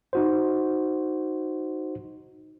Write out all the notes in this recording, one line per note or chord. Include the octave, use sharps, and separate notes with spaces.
D#4 F#4 C5